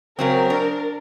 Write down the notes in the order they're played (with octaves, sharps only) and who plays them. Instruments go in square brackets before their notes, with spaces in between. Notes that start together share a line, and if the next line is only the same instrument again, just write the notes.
[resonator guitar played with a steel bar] C#3 F#3 C4 [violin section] A#4
[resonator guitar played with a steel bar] D4